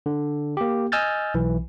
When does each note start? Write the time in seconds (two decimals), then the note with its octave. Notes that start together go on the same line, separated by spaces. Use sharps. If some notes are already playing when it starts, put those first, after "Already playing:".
0.06 D3
0.57 A#3 G4
0.92 D#5 G#5 E6 F6 G6 A6
1.34 B1 E3